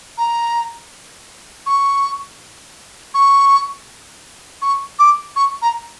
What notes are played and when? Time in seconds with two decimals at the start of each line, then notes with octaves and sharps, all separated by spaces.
0.18 A#5
1.66 C#6
3.14 C#6
4.62 C#6
4.99 D6
5.36 C#6
5.62 A#5